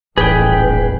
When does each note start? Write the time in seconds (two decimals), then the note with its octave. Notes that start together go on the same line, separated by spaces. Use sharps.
0.18 D#1 A1 G#4 B4 G5